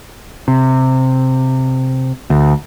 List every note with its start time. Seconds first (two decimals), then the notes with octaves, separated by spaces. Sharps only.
0.48 C3
2.30 D2